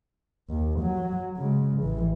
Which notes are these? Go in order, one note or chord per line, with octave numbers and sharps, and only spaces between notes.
D#2
F#3
C#3 G#3
A1 E3